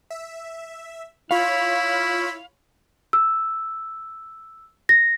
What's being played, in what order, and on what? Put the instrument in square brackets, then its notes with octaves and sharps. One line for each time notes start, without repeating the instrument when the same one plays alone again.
[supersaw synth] E5
[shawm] E4 [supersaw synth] F4 C#5 B5 [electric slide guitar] F5
[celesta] E6
A#6